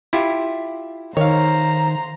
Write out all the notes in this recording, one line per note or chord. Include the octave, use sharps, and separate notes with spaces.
E4 F4 G4
D#3 C5 C#5 F5 A#5